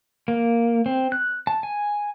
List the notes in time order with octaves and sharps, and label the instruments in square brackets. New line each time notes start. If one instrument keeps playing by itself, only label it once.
[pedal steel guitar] A#3
C4
F#6
A5
G#5